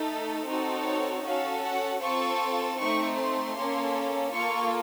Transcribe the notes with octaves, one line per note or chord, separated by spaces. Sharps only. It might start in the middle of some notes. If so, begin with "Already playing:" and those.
Already playing: A3 D#4 A4
C4 D#4 F#4 A4
C#5
C#4 F#4 A4 F5
F#5
C4 F4 A4 C#6
A3 C4 D#4 C#6
C6
A#3 C#4 A4
A#3 F4 A4 C#6